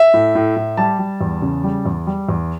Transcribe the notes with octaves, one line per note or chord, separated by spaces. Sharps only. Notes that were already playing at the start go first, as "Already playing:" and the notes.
Already playing: E5
A2
A2
A2
G3 A5
G3
E2
C#3
G3
E2
G3
E2